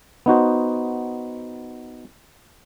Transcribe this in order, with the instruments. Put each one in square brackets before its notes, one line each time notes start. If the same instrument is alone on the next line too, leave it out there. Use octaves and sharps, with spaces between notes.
[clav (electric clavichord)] B3 D#4 F#4 C5